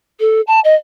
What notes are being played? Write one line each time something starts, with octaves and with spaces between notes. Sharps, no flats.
A4
A5
D#5